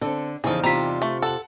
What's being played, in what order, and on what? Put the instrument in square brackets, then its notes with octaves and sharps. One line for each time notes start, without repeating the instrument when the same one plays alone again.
[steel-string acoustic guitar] D3 [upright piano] C4 A4
[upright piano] E2 D#4 [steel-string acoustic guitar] C#3 F3 [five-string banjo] G#4 A4
[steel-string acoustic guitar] C3 F4 [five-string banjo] G3 [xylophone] A#5 B6
[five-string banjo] A3 [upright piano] C#6
[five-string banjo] A4 [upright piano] F#5 A5 F#7